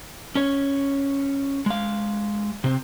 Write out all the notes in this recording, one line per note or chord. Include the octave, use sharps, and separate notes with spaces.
C#4 C#5
G#3 F5
C3 C4